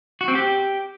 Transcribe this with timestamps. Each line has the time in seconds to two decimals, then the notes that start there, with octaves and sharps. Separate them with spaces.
0.21 F#4
0.28 C4
0.35 G4